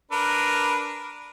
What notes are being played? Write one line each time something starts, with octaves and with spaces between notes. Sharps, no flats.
D4 A#4 B4